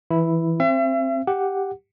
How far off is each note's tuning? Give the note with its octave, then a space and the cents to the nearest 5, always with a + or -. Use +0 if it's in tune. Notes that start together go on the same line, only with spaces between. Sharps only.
E3 +0 E4 +0
C4 +15 E5 +40
G4 +0 F#5 +0